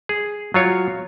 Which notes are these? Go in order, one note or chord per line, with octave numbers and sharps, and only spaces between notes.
G#4
F#3 F4 C#5